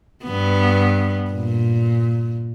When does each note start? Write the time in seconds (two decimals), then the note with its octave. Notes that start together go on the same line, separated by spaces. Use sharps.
0.24 G2 B3
1.31 A#2